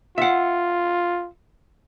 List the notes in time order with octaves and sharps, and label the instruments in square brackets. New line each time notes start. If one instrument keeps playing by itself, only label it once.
[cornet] F4 [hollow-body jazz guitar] E5 F#5